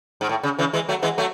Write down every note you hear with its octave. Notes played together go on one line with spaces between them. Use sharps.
G#2
A2
C#3
C#3 E3
E3 G#3
F#3 A3
E3 G#3
F#3 A3